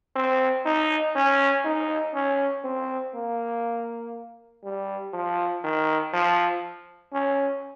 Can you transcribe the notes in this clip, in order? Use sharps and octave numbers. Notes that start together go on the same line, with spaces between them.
C4
D#4
C#4
D#4
C#4
C4
A#3
G3
F3
D#3
F3
C#4